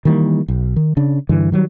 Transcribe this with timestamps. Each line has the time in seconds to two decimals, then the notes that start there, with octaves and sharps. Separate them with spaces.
0.05 D#3 E3 G3 A#3
0.48 B1
0.76 D#3
0.97 C#3 D4
1.29 G2 D3 E3
1.52 D#3 F#3 G3